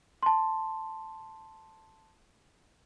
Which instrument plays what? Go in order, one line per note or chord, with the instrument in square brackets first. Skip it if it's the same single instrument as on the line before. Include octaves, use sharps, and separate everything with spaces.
[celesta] A5 C6